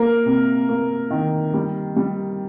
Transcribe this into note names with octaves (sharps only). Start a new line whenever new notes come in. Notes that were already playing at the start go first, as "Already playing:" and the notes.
Already playing: A#3 A#4
C3
A#3
D#3
G3
G3